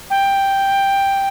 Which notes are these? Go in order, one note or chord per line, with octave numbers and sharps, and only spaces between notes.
G5